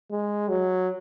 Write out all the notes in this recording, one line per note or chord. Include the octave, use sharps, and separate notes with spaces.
G#3
F#3